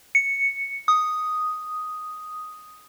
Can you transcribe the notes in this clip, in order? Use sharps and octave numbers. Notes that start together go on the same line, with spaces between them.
C#7
D#6